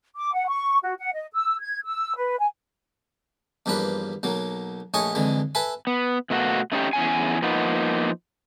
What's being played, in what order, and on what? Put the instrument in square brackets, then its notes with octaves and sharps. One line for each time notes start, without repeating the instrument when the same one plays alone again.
[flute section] D6
F#5
C#6
F#4
F#5
D#5
E6
G#6
E6
B4
G#5
[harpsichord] E2 G2 F3 A#3 B4
B1 F#3 A#3
A#1 A3 C#5 D#5 G#5 C#6
F2 D3 E3 G#3
A4 B4 E5 G#5
[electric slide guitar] B3
B2 A3 A#3 F#4
A3 C#4 D#4 E4 G4
E2 C#3 C#4 G#4 G#5
F3 A#3 B3 D#4